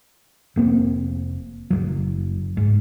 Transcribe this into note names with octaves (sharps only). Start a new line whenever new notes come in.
F1 A#3 C4
F#1 C2 F#3
G#2